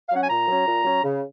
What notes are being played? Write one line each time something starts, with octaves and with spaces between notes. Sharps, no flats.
F5
F#3 C#4 F#5
G#5
A#2 A#5
F#3 C#4
A#2
F#3 C#4
C#3